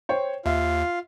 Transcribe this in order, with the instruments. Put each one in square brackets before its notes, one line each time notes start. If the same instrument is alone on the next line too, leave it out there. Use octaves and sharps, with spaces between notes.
[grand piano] C5 C#5 G5
[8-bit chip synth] D#2 [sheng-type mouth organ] F4 [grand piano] E5